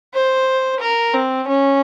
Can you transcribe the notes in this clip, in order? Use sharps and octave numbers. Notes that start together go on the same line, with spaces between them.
C5
A#4
C4
C#4